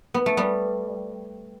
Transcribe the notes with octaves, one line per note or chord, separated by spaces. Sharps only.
B3
A3
G3 B3